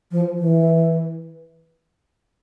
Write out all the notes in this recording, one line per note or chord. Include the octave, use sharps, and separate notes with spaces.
F3
E3